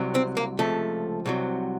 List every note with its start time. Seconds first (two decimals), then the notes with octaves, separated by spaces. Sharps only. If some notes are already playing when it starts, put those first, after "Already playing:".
Already playing: C2 C3 F#3
0.15 C4
0.37 A#3
0.59 C#2 C3 F3 A3
1.26 C2 C3 F#3